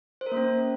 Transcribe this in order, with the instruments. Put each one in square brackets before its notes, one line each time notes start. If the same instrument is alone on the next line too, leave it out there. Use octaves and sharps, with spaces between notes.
[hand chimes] C5
A#4
A#3
C#4